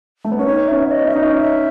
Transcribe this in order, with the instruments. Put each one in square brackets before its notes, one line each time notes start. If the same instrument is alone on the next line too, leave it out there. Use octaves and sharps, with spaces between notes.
[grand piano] A3
B3
[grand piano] C#4 [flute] B4
[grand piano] D#4 [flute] C#5
[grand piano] C#4 [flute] E5
[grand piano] B3
[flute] C#5
D#5
[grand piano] C#4 [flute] E5
[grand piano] D#4 [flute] D#5
[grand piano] C#4
[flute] E5